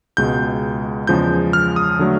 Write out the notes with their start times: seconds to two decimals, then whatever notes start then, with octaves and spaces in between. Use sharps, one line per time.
0.17 C#2 B2 G#3 G6
1.07 E2 C#3 F3 G#3 G6
1.53 F6
1.76 D#6
1.99 D3 F#3 A3